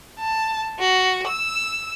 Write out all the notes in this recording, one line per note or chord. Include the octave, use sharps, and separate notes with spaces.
A5
F#4
E6